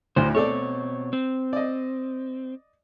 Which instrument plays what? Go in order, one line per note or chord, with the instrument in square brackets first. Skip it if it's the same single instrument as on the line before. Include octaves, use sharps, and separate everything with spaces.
[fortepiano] D2 A2 [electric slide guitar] C5
[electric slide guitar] B2 C4 C#5 [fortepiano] A3 A4 D5
[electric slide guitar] C4
[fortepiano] D5 D#5